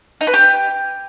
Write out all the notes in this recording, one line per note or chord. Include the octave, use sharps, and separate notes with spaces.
D#4
B4
G4